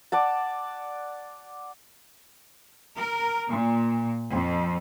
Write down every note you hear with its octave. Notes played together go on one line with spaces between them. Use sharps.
D5 F#5 A5
A#4
A#2
F2